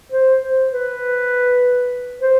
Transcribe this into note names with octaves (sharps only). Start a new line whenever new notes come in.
C5
C5
B4
C5